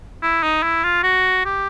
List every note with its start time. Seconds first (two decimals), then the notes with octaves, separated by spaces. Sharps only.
0.23 E4
0.43 D#4
0.63 E4
0.84 F4
1.04 F#4
1.45 G4